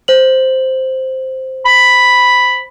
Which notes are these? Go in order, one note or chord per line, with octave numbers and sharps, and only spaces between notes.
C5 F#7
B5